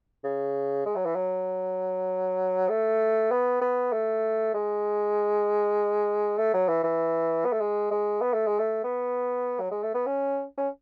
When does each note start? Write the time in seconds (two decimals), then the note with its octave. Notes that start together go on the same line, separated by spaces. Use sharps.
0.24 C#3
0.86 G#3
0.96 F#3
1.05 E3
1.15 F#3
2.69 A3
3.31 B3
3.61 B3
3.93 A3
4.54 G#3
6.38 A3
6.54 F#3
6.68 E3
6.83 E3
7.45 B3
7.53 A3
7.60 G#3
7.91 G#3
8.22 B3
8.34 A3
8.46 G#3
8.59 A3
8.84 B3
9.60 F#3
9.71 G#3
9.83 A3
9.94 B3
10.06 C#4
10.58 C#4